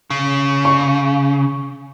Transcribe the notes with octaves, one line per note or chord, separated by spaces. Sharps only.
C#3
C#6